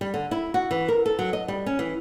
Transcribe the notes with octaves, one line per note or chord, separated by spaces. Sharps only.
G3
D3
E4
F#4
E3
A#4
A4
F#3
D#5
G3
C#4
E3